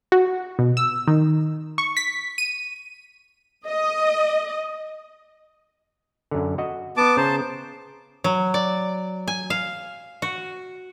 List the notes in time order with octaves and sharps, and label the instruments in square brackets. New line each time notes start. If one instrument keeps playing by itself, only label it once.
[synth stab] F#4
B2
E6
D#3
C#6
B6
D#7
[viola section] D#5
[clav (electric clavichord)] F#2 D3
F#4 D#5
[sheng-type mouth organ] B3 A5 D6
[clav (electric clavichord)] C#3 A#5 [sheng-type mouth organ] C5 A5
[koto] F#3
D5
G#5
F5
F#4